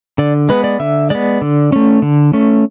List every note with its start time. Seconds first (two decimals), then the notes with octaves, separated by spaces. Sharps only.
0.18 D3 D5
0.49 G#3 B3 B4
0.64 D5
0.80 D3 E5
1.10 G#3 B3 D5
1.42 D3
1.72 A3 C#4
2.02 D3
2.33 A3 C#4